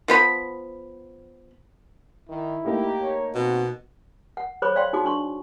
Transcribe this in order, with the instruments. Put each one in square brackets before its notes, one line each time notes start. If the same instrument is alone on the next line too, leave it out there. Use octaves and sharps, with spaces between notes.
[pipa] F3 B3 B5
[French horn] D#3 [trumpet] E4
[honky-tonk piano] A3 A#3 D#4 [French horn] G4
[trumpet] C#5
[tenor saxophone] B2 [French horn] C4 [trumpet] F#4
[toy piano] F#5
G#4 C5 C#5 B5 D6
D5 F5 G5 C6
D#4 F#4 G#4 D6
D4 C6 C#6